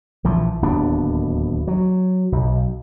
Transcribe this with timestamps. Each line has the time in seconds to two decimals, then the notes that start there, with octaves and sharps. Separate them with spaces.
0.24 A#1 E3 F3
0.62 D1 D#2 B3 D4
1.67 F#3
2.32 B1